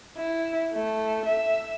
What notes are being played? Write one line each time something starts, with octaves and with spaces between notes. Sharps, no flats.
E4
A3
E5